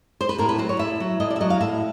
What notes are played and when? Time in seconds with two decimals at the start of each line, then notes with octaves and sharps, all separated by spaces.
0.21 C5
0.29 B4
0.38 A2 A#4
0.49 B4
0.58 F#3 C5
0.69 C#5
0.79 A2 E5
1.00 F#3
1.20 A2 D#5
1.30 D5
1.36 E5
1.41 F#3 D#5
1.50 F5
1.60 A2 E5